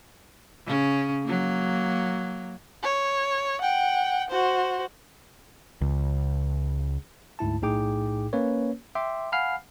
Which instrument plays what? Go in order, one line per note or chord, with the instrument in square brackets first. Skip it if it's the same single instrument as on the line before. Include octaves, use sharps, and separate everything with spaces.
[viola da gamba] C#3 C#4
F#3 A#3
[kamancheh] C#5
F#5 G5
F#4 C5
[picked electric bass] C#2
[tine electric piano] D2 G#2 E4 A5
B1 A2 D#4 G#4 G5 D6
A#3 C#4 B4 C#5
E5 G5 C6 D6
F5 F#5 G#5 B5 F6 C7